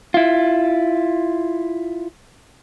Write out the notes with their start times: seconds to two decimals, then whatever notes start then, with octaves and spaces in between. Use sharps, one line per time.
0.14 E4 F4